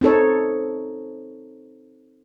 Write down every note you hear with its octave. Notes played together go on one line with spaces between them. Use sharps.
C4 D#4 A4 C#5